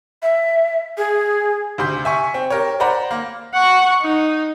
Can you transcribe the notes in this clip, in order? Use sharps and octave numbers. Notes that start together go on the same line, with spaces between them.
E5
G#4
D2 C3 C6 G6
E5 G#5 C#6
C4
G4 A#4 C#5
C5 D5 F#5 A#5 B5
A#3
F#5 C#6
D#4